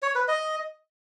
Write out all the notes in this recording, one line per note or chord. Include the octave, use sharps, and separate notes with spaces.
C#5
B4
D#5